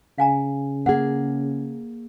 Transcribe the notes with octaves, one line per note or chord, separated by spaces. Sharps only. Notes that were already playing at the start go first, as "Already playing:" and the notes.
C#3 F5 G#5 A#5
A#3 G#4 F#5